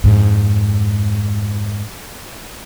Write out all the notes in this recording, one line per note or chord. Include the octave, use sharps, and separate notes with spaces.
F2 G#2